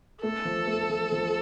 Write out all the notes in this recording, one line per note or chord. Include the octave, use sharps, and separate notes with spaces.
A3 A4
F3
A3
F3
F3